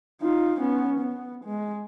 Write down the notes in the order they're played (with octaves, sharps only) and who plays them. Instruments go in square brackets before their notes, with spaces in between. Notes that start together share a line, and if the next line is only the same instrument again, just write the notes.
[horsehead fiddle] D#4 F4
B3 C#4
B3
G#3